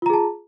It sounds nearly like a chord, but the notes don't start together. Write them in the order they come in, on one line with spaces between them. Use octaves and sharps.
F4 A#5 G#4 A5